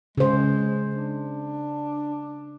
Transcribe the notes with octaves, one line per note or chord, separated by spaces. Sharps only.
C#3 G#3 C5
D4